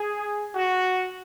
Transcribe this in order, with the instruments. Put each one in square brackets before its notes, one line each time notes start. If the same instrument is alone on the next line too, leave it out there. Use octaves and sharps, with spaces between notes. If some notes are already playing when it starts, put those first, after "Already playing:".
Already playing: [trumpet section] G#4
F#4